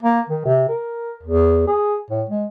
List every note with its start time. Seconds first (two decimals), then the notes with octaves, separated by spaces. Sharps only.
0.03 A#3
0.30 D#3
0.45 C3
0.69 A#4
1.23 E2
1.67 G#4
2.11 A2
2.29 G#3